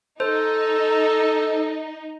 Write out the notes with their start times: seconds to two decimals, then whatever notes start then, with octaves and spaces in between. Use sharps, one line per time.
0.20 D#4 A4 C5